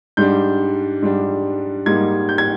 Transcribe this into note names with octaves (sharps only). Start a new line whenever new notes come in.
G#2 G3 D4 G6
G#2 G3 D4
G#2 G3 A#3 D#4 G#6
G6
G#6